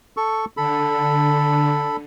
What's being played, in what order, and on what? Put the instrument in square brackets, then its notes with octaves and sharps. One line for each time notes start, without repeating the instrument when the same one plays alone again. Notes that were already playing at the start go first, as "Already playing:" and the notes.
[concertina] A4 C#6
[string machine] D3 [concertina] A4 B5